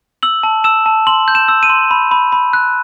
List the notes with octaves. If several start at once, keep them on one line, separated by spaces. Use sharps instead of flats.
E6 F#7
A5
E6 E7
A5
C6 F#7
G6
E7
E6
D#7
C6
B5
B5
B5
F#6